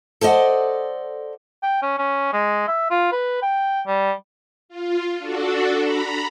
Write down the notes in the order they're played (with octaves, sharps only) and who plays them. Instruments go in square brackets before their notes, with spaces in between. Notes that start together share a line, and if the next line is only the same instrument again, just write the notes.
[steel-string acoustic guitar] A4 C5 D5 D#5 F#5
[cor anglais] G5
C#4
C#4
G#3
E5
F4
B4
G5
G3
[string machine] F4
D4 F#4 A4
A#5 B5